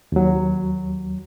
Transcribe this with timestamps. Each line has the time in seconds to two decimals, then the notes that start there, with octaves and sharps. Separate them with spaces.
0.12 D#2 F#3